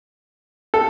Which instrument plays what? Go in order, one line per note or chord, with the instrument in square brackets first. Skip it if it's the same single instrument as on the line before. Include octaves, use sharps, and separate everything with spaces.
[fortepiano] A4